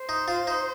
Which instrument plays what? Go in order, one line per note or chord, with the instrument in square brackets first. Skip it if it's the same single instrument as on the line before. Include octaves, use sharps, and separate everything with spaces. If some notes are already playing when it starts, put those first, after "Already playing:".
Already playing: [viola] C5
[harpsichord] D#4
F4
D#4